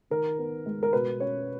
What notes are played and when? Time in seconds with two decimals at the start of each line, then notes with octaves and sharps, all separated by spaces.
0.10 D#3 A#4
0.39 B3
0.66 G#3
0.83 A#4
0.93 B2 B4
1.20 C#4 C#5